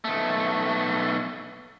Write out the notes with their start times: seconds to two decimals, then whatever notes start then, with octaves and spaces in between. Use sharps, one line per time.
0.05 B1 A3